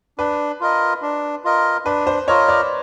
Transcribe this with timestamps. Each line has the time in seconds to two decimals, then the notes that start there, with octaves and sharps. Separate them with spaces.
0.18 D4 B4
0.61 F4 A#4 D#5
1.02 D4
1.44 F4 A#4 D#5
1.85 D4 B4
2.07 C5
2.28 F4 A#4 C#5 D#5
2.48 D5